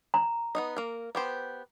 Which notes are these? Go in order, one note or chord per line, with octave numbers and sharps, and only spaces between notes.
A#5
B3 D#4 D#5
A#3 A#4
B3 G4 C5